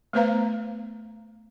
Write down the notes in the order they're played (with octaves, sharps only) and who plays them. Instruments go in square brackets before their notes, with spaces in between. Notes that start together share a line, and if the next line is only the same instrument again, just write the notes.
[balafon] A3 B3 B4 C5 F5 A#5